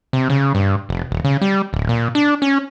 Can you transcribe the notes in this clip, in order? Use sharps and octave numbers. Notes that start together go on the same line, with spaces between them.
C3
C#3
G2
F1
D#1
C#3
G3
D1
A#2
D4
C#4